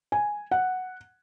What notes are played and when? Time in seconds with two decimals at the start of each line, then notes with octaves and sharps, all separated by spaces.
0.12 G#5
0.51 F#5